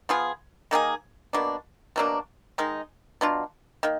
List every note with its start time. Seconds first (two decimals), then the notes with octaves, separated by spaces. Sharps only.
0.09 F3 B3 F4 G#4
0.71 D#3 A#3 D#4 G#4
1.33 B2 A#3 D4
1.96 B2 F#3 A#3 D4
2.58 D#3 G#3 D#4
3.21 B2 F#3 D4 F4
3.83 D#3 A#3